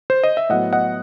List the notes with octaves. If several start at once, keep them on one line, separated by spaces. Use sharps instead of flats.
C5
D#5
E5
A2 F#3 B3 D#5 F#5
D#5 F#5